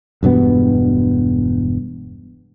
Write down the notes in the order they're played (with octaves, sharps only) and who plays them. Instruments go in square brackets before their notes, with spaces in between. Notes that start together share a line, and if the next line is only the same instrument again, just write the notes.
[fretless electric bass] E1 G2 B2 B3